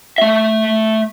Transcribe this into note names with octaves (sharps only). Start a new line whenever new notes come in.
A3 E5